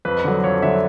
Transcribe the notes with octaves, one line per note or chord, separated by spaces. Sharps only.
F2 B4
D3 F#3
F2 C#5
D3 F#3 E5